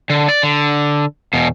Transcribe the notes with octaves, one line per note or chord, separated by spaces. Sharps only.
D3
D5
D3
E2 B2